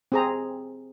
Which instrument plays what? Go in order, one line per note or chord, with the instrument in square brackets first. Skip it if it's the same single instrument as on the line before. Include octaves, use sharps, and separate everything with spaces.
[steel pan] C4 G#4 A#5